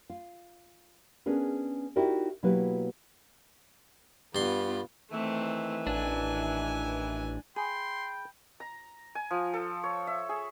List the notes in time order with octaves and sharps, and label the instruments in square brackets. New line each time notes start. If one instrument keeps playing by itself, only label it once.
[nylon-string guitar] F4
B3 C#4 D4 G#4 A#4
D#4 E4 F#4 G4 A#4 D5
B2 F#3 A#3 E4 G4 B4
[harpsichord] G2 C6 [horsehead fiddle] B3 F4
[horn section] D#3 E3 [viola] A3 C4
[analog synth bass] A1 [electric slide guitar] D4 [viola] G#5
[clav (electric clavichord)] G#4 [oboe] G5 [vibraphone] B5 [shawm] C6
[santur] A#5
G#5
F3
A4
C#5
E5
G#4